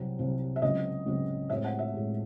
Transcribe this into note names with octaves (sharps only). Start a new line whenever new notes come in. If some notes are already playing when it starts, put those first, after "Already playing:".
Already playing: C2 C3 F#3 C4
C2 C3 F#3 C4
E5
C#2 C#3 F#3 C4 D#5
C#2 C#3 F#3 C4
A2 G#3 C4 E5
F#5
E5
A2 G#3 C4